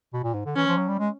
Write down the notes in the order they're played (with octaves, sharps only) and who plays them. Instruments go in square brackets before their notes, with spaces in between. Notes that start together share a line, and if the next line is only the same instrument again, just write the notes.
[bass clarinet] B2
A#2
G#2
D3
[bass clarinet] E3 [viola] C#4
[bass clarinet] F3
F#3
G3
G#3